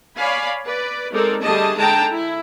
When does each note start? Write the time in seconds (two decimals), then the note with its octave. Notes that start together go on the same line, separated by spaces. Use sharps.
0.16 C#5 D5 F5 G#5 B5
0.64 B4 D5
1.13 G#3 C4 D#4 A4 A#4 D5
1.42 D3 G3 A3 G#4 D#5 A5
1.77 D3 G#3 D#4 G5 A5 A#5
2.11 E4